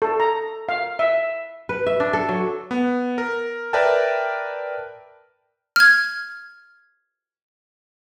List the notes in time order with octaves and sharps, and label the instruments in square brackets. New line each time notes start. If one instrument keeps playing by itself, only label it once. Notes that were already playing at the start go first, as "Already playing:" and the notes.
[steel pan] A4
A#5
F5
E5
[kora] B4
E5
D4
A4
F#3
[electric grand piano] B3
A#4
A#4 B4 D5 E5 G5 A5
[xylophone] F6 G#6